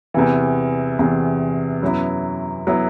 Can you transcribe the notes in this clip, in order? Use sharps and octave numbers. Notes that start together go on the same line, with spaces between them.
E2 C3 E3
E2 C3 E3
F#2 F#3 B3 E4
F#3 B3 E4